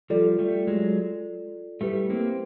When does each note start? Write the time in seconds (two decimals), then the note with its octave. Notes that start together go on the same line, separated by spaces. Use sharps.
0.10 F3 G3 F4 A4 D5
0.39 G3 A3
0.67 F#3 G#3
1.81 G3 A3 E4 G4 B4
2.10 A#3 C4